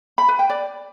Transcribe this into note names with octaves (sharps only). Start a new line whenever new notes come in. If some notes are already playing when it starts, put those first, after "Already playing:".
B5
B4
G5
D5